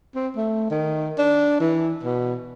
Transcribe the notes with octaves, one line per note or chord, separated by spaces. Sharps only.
C4
A3
D#3
D4
E3
B2